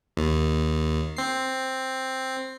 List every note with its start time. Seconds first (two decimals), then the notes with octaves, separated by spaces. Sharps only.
0.17 D#2
1.17 C4 C7